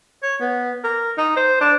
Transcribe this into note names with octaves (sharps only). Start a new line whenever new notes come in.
C#5
B3
A#4
D#4
C5
D4